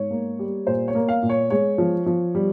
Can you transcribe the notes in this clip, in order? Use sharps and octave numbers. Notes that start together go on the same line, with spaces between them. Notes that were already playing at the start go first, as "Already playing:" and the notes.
Already playing: G#2 C#5
A#3
G3
A#2 C5
C#5
A#3
F5
A#2
C#5
G#3 C#5
F3
F3
G3